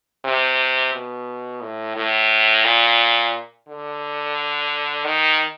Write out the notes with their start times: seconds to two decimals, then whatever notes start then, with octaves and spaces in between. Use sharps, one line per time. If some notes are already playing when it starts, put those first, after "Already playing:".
0.25 C3
0.93 B2
1.61 A2
1.96 A2
2.64 A#2
3.68 D3
5.05 D#3